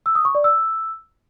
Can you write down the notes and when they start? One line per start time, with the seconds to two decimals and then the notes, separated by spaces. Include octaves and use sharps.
0.06 E6
0.15 D#6
0.25 C#6
0.35 D5
0.44 E6